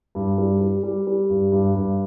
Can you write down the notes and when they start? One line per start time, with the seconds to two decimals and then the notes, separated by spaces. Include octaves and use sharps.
0.15 G2
0.38 G3
0.60 G3
0.83 G3
1.07 G3
1.30 G2
1.52 G2
1.75 G2